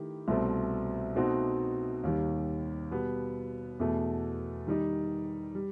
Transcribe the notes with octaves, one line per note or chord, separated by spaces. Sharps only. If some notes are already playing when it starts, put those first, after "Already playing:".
Already playing: D#3 A3 E4 G4
C2 B2 A3 C4
B2 A3 C4 D#4 F#4
D#2 D#3 G3
B2 G3 B3
E2 B2 A3
D#3 G3 D#4
G3